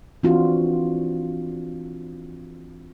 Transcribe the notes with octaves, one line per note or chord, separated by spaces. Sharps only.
E3 C4 D4 F4 F#4